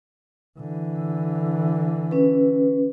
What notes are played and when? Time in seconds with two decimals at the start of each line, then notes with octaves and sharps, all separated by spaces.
0.59 D3 E3
2.11 C#4 B4